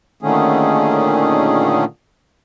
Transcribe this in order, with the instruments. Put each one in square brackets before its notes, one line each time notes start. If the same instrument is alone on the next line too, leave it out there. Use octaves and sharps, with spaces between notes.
[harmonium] A#2 D3 D#3 A3 C#4 G#4